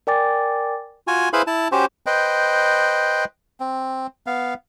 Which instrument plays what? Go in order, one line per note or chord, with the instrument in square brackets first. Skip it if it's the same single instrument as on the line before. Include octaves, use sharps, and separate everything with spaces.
[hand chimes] A#4 D5 G5 G#5 D6 A6
[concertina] F4 F#4 G#5
E4 G#4 B4 C5 F5 B5
E4 A5
C#4 F#4 G4 C5
[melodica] B4 C5 D#5 G5
C4
B3 F5